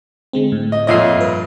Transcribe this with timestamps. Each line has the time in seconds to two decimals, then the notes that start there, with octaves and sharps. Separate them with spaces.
0.33 D3 G#3 C4
0.52 A2
0.72 D#5
0.87 F2 A#2 C#5 D#5 E5 C7
1.16 G2 B4